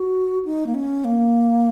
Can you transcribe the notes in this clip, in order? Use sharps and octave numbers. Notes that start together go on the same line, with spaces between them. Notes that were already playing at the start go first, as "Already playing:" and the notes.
Already playing: F#4
D#4
A#3
C#4
A#3